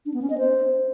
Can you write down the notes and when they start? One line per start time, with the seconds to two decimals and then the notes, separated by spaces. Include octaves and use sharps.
0.06 D4
0.14 B3
0.22 C#4
0.30 D#5
0.38 C5